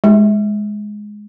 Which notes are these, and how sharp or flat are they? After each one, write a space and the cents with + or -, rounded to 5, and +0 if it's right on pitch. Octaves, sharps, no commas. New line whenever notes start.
G#3 +5